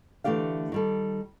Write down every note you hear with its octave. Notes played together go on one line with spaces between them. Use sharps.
D3 E3 A3 G4 D5 F5
D#3 G3 A4